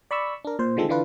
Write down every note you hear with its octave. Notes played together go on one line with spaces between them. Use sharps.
D5 B5 C#6 E6
D4 A#4
A#2 C5
D3 D#3 F3 G#3 C4 A4
D3 E3 D4 F4 B4